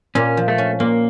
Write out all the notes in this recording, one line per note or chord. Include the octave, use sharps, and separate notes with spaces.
A#2 C#4
F3
A3
C#4
A#2 A#3